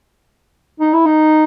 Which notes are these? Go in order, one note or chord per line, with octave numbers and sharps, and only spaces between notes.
D#4
E4
D#4